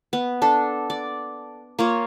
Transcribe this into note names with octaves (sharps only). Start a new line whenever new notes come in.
B3
D4 A4
D5
A#3 F4 C#5